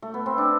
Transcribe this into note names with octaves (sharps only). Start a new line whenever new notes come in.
A3
B3
C4
D4